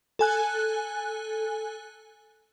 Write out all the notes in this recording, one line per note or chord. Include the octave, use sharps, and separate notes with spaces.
A4 G#5 F#6